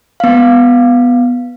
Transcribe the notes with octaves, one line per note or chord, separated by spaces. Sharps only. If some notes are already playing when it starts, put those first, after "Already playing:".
B3 F5